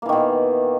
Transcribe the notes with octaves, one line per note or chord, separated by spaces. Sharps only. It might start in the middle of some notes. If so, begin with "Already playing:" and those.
B2 D#3 E3 A#3